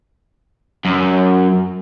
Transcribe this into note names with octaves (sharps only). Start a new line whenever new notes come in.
F#2